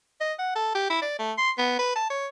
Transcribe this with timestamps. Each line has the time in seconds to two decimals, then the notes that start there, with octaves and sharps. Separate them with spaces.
0.21 D#5
0.39 F#5
0.56 A4
0.75 G4
0.90 E4
1.02 D5
1.19 A3
1.38 C6
1.58 B3
1.79 B4
1.96 A5
2.10 C#5